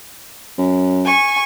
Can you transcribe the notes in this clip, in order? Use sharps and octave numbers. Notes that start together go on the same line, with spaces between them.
F#2
G#5 C#6